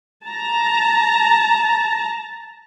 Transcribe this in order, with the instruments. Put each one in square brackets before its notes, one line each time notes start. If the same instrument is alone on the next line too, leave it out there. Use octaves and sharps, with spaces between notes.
[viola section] A5 A#5